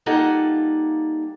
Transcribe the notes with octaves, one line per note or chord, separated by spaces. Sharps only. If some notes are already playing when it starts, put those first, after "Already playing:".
G3 A#3 D#4 F4 A4 F#5